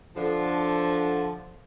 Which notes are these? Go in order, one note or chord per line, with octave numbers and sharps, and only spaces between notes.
D3 F3